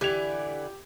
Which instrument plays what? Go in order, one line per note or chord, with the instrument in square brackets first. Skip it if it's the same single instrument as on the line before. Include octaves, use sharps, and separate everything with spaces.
[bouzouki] D3 E3 E4 [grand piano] G4 G#6 F7